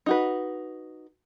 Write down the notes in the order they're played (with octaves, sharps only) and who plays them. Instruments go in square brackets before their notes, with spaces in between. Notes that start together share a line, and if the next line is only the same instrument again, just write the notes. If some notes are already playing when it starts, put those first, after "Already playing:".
[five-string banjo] D#4 F#4 B4